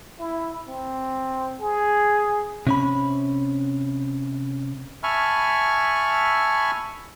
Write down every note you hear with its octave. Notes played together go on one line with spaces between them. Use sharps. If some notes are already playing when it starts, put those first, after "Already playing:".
E4
C4
G#4
C3 C#4 B5
E5 G#5 A5 B5 C#6 F6